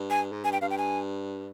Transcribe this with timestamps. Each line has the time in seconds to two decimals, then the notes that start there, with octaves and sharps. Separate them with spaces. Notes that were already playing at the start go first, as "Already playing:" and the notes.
Already playing: G2
0.10 G#5
0.32 G#2
0.44 G2 G#5
0.53 G5
0.61 G2 F5
0.70 G5
0.78 G#5